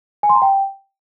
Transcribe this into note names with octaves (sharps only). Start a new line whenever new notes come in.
G#5
C6
A#5
G5